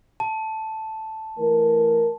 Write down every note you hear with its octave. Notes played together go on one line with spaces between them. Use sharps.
A5
E3 A3 A#4